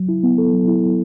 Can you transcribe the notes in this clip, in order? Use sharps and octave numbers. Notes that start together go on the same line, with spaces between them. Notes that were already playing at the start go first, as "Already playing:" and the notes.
Already playing: F#3
E4
B3
A4
F#3
E4